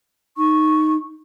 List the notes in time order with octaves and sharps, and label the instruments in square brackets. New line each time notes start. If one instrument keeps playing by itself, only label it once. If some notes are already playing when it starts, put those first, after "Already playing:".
[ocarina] D#4 [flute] C#6